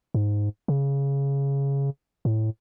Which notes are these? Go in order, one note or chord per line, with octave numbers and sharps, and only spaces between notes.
G#2
C#3
A2